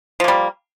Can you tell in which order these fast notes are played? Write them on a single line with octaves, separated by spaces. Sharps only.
F3 A#3 G3